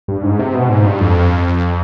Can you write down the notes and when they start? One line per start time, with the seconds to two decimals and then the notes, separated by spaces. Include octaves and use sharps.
0.08 G2
0.23 G#2
0.39 C3
0.54 B2
0.69 G#2
0.85 G2
1.00 F2